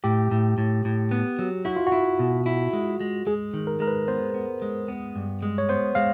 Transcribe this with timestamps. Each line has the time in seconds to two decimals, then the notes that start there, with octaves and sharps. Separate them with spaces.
0.04 A2 G4
0.31 A2
0.58 A2
0.85 A2
1.11 B3
1.39 F#3
1.65 E4 F#4
1.76 F4
1.87 F#4
1.92 E4
2.19 B2
2.46 E4
2.73 G#3
3.00 G#3
3.26 G#3 G#4
3.54 D#3
3.67 A#4
3.80 G#3 A#4
3.87 B4
4.08 B3 C5
4.34 B3
4.62 G#3
4.88 B3
5.16 G2
5.42 G#3
5.58 C#5
5.69 B3 C5
5.95 G#3 F5